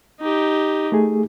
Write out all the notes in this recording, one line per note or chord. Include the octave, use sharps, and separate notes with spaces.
D#4 G4
A3 G#4